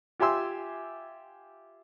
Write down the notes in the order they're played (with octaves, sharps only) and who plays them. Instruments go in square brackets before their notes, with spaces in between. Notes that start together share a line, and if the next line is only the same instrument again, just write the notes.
[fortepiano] F4 G4 E5 G#5 C6 E6